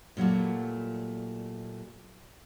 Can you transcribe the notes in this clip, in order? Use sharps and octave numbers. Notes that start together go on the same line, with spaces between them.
A#2 F#3 G3 A3